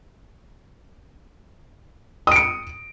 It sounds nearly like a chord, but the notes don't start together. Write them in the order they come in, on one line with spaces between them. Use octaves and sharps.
D#6 D7 C#7